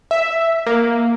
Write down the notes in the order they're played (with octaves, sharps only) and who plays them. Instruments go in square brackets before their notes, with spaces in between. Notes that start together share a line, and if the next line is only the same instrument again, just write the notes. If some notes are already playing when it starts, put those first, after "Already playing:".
[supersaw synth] E5
A#3